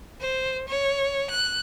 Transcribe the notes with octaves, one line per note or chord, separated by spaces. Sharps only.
C5
C#5
F#6